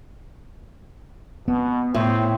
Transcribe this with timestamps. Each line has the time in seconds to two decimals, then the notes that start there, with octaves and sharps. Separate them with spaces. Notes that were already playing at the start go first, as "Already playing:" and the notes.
1.48 B2 B3
1.94 A2 C4